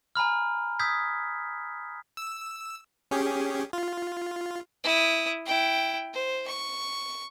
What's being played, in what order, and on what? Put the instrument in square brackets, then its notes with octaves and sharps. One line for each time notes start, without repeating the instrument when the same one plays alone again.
[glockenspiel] G#5 A#5 B5 F6
D#6 E6 G6 G#6 B6
[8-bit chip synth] E6
C#4 G4 G#4
F4
[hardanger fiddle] E4 D#6
E4 G5
C5
C#6